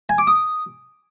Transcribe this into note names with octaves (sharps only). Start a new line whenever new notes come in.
G#5
D6
D#6